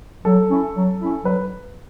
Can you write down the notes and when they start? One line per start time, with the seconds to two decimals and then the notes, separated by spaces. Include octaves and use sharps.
0.25 F#3 A4
0.50 C#4 E4
0.76 F#3
1.01 C#4 E4
1.25 F#3 B4